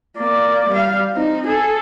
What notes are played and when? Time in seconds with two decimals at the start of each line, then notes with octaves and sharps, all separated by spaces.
0.17 A#3 D5
0.69 G3 F5
1.13 C4 D#4
1.46 G#4 A4